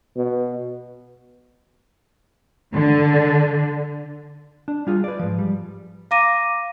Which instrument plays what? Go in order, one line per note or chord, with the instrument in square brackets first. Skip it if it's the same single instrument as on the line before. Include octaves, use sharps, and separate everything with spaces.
[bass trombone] B2
[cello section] D3
[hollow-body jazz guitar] D4
G3 F4 G#4
B4 D5
G#2 F3
G3
[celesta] F5 A#5 D6 A#6 D#7